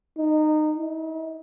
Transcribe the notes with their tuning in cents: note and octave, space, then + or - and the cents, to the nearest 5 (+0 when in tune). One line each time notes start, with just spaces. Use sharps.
D#4 -20
D#4 +45